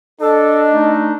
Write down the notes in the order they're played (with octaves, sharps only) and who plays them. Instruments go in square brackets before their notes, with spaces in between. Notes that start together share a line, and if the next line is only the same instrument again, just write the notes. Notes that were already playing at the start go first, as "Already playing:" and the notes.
[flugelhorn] D4 [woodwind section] A4 [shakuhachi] D#5
[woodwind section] A3 D#4